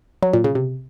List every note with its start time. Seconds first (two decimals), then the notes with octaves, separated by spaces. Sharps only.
0.23 F#3
0.33 A#2
0.44 C#3
0.55 C3